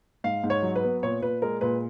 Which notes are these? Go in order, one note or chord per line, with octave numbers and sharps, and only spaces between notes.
G#2 F5
G#2
C#5
F#3
B4
B3
A#2 C#5
A#2 B4
G#3 A#4
A#2 B4